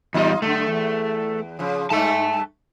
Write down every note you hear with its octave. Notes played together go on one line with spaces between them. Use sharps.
E2 G3 D#4 F4 D#5
F#2 D3 A3
E2
C#3 F3
G2 A3 A4 E5 A5